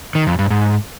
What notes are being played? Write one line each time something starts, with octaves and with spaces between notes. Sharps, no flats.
D#3
F2
G2
G#2